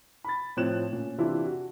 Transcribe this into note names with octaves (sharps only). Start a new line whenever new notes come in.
B5 A6
A2 F3 C4 C#5 F#6 E7
A#2 C#4
C3 E3 D4 E4 F4
F#4